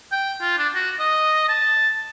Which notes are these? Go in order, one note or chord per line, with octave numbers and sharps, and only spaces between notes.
G5
F4
D4
F#4
D#5
A5